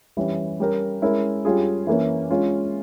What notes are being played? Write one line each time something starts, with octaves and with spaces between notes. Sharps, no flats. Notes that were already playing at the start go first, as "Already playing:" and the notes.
E3 G3 C#4
G3 C#4 G4 A#4
G#3 C#4 E4 A#4
G3 C#4 F4 G#4
E3 A#3 C#4
G#3 C#4 F4